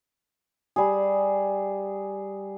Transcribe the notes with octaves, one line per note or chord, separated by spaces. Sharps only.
G3 G#4